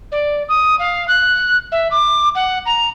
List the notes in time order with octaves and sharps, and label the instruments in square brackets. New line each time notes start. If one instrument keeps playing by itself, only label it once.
[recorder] D5
D#6
F5
F#6
E5
D6
F#5
A#5